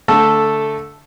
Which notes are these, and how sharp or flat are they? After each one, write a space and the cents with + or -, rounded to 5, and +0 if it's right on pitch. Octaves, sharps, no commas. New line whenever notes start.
D3 -20 A3 +0 A4 +0